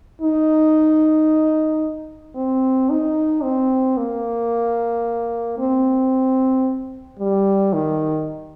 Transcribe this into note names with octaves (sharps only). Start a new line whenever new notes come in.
D#4
C4
D#4
C4
A#3
C4
G3
D#3